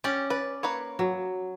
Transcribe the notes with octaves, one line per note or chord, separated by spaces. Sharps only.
C#4 G4 D5
B4 D5
A#3 B4 C#5
F#3